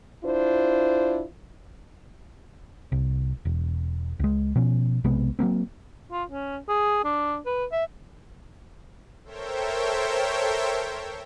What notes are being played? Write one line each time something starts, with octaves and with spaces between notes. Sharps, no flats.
D4 E4 F4 C5
C2
E1
C#2 G#3
B2 F3 C#4
B1 C3 G#3 B3
F#3 G3 A#3 C4
F4
C#4
G#4
D4
B4
E5
A4 A#4 C5 C#5 E5 G5